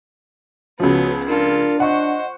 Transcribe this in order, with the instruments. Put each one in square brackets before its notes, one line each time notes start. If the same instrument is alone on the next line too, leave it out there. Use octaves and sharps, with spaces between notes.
[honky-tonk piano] C#2 F3 [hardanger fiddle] B3 [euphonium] C#4 [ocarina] F#4
[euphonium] D4 [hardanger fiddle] F4 A4 [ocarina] A#4
[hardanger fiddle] C5 [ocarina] D#5 [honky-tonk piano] F#5 C#6